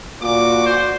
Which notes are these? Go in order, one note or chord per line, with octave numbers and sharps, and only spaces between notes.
A#2 F#4 D5 D6
C5